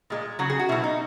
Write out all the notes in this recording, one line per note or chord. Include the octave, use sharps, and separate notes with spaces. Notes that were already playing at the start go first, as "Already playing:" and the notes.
A#2 G#3
C#3 F#3 F#4
G#4
F#4
B2 F#3 E4
D#4